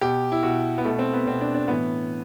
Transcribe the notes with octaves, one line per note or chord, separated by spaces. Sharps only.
B2 G4
E4
B2 F#4
B3
B2 A3
C4
B3
B2 C4
D4
D4
A2 E3 B3